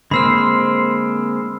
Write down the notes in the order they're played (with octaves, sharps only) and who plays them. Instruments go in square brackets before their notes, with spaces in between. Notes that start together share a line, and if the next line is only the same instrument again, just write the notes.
[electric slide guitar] D3 A#3 C4 [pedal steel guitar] G#3 C5 [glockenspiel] B5 E6 F6